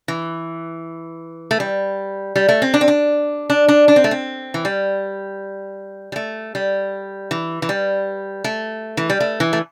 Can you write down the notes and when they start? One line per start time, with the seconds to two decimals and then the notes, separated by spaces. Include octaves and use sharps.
0.08 E3
1.51 A3
1.60 G3
2.36 G3
2.49 A3
2.62 C4
2.74 D4
2.81 C4
2.88 D4
3.50 D4
3.68 D4
3.88 D4
3.96 C4
4.04 A3
4.11 C4
4.54 E3
4.65 G3
6.12 G3
6.16 A3
6.55 G3
7.31 E3
7.62 E3
7.69 G3
8.44 A3
8.97 E3
9.10 G3
9.20 A3
9.40 E3
9.53 A3